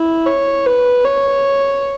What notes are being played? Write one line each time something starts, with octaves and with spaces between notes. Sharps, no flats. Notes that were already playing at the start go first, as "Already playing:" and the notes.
Already playing: E4
C#5
B4
C#5